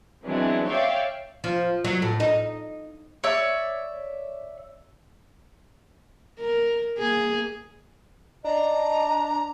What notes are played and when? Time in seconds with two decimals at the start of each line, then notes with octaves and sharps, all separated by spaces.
0.25 E3 F#3 G#3 B3 C4 D4
0.67 C#5 D5 E5 F5 G5 C#6
1.44 F3
1.84 F#3
2.02 A2
2.20 D#4
3.24 C#5 D5 E5
6.39 A#4
6.98 A#3 G#4
8.44 D4 D#5 A#5